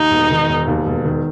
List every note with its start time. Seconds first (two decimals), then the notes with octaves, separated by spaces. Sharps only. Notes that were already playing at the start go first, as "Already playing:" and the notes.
Already playing: D#2 D#4
0.11 E1
0.30 D#3
0.49 E1
0.68 D#2
0.87 E1
1.05 D#3